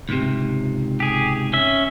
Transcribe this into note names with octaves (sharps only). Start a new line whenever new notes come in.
C#2 G#2 C3
G4 G#4
C#4 E5